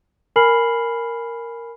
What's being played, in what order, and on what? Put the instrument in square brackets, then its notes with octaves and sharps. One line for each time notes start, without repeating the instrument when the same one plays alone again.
[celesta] A#4 G#5 B5 F6 C7 F#7